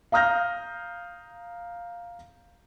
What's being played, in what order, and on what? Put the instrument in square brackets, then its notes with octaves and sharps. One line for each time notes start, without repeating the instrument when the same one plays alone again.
[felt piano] F5 A#5 D#6 F6 G6 A#6